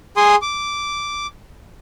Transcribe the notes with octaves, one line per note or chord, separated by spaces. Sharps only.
G#4 G#5 C6 D#6
D6